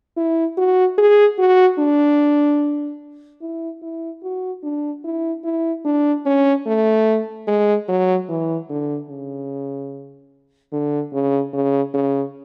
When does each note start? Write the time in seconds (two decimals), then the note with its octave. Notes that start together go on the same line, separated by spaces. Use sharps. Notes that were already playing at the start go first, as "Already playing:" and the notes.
0.17 E4
0.57 F#4
0.98 G#4
1.38 F#4
1.79 D4
3.41 E4
3.82 E4
4.23 F#4
4.63 D4
5.04 E4
5.45 E4
5.85 D4
6.26 C#4
6.66 A3
7.47 G#3
7.88 F#3
8.29 E3
8.70 D3
9.10 C#3
10.73 D3
11.13 C#3
11.53 C#3
11.94 C#3